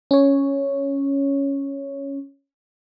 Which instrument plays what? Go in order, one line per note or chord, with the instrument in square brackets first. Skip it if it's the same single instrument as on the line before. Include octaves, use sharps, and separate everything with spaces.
[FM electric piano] C#4 C#5